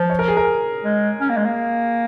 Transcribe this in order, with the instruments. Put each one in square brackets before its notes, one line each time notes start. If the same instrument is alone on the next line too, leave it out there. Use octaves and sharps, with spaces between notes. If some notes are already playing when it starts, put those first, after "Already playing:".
Already playing: [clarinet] F3
[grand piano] C#5
A#4
G#4
A#4
[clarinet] G#3
C#4
A#3
G#3
A#3